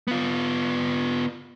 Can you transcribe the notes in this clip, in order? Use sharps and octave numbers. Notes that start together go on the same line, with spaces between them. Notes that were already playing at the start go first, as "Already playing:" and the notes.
B3 F4